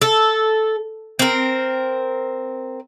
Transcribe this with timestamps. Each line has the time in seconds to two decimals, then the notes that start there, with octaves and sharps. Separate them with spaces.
0.02 A4
1.19 C4 A#4